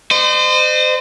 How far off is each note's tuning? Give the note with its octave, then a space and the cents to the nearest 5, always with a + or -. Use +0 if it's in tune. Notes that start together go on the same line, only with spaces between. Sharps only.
C5 -30 D#5 -40